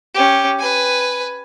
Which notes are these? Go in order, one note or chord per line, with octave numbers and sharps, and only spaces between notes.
C#4 G4
B4 G#5